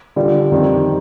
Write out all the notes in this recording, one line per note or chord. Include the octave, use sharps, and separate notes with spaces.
D3 G3 D4 F4
F2 D#3 G3 C4